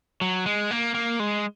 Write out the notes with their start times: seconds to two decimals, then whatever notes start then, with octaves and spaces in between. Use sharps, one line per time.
0.21 F#3
0.46 G#3
0.71 A#3
0.94 A#3
1.20 G#3